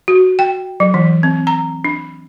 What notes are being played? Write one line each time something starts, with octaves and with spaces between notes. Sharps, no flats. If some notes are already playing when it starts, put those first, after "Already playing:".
F#4
G5
F#3
E3
C4
A#5
D4